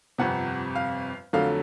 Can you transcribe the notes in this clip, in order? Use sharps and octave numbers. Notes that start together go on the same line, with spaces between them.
G1 F2 C3 F#5
F5
F2 D3 F#3 A3 F5